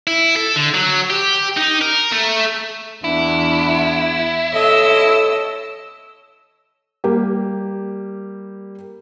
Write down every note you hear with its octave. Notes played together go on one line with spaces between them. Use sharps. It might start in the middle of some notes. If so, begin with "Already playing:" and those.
E4
A4
D3
F#3
G4
D#4
A#4
A3
E2 B3 D4 E4
A4 C#5 D#5 E6
G3 A#3 G4